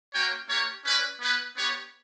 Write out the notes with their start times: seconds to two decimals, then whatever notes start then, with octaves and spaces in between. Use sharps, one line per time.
0.13 A#3 C#4 F#4 C#5 G5
0.48 A#3 D4 G4 C#5
0.84 C#4 E4 B4 D5
1.20 B3 E4 B4
1.55 B3 D4 G4 C#5